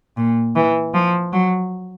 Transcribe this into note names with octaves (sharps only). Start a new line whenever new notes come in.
A#2
E3
F3
F#3